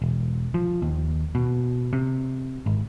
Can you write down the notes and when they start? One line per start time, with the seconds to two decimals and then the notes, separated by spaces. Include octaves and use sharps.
0.02 E1
0.54 F3
0.82 D#2
1.35 B2
1.93 C3
2.66 G#1